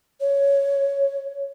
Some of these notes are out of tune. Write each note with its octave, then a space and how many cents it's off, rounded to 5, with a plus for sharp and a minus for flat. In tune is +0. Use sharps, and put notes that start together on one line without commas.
C#5 +5